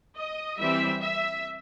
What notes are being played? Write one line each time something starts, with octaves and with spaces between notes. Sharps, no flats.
D#5
E3 G3 C4 E5
E5